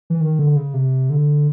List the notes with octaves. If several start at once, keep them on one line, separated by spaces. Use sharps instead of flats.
E3
D#3
D3
C#3
C3
D3